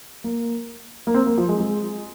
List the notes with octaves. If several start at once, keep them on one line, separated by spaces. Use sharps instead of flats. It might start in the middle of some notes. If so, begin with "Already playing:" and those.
A#3
A#3
C4
A#3
F3
G#3
G#3